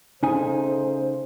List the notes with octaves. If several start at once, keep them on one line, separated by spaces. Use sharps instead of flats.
C#3 A3 D#4 C5 G#5